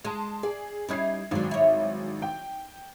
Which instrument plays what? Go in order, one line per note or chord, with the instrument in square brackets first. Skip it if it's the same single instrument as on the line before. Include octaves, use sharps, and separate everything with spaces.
[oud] G#3 [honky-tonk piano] A5 C6
[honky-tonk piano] G#4 [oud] D5
[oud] G3 D#4 E4 [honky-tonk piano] C#4 G#6 C7
[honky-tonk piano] G#1 F#3 [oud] C4 D4
[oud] E4 C#5
[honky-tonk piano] G5